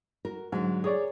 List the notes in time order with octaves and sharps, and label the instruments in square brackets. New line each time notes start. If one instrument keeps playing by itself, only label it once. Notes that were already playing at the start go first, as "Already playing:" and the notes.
[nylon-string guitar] F#4 A#4
[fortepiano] G#2 [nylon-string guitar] D3 F#3
[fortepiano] G#4 C#5 D5 [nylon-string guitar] A#4